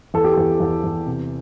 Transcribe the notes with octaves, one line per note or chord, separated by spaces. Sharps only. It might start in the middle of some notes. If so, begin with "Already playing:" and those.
E2 A4
G4
E2 A4
E2
E2
C3